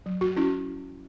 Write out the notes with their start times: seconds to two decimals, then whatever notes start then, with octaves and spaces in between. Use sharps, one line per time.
0.06 F#3
0.21 F#4
0.36 C#4 E4